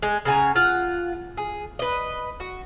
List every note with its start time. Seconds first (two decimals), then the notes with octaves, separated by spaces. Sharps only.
0.03 G#3
0.25 C#3 F#5 G#5 A#5
0.55 F4 F#5
1.37 G#4
1.79 B4 D#5
2.40 F#4